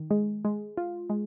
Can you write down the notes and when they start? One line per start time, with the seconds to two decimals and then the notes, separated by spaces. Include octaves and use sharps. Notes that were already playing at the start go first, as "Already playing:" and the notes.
Already playing: D#3
0.11 G#3
0.45 G#3
0.77 F4
1.10 G#3